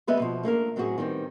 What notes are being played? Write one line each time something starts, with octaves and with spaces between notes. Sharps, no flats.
D2 G3 B3 B4 D#5 E5
B2 F3
A3 A#3 D4 A#4
A2 F#3 C4 F4 F#4 G#4
D#3 G3 B3 C4